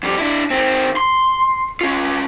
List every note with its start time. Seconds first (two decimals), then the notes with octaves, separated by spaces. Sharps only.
0.03 F2 G3
0.18 D4 E4
0.51 D#3 C4
0.97 C6
1.81 C#4 F4